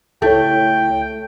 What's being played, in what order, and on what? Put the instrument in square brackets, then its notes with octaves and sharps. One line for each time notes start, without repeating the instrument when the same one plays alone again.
[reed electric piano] C#2 E4 C#5 [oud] A3 [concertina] G5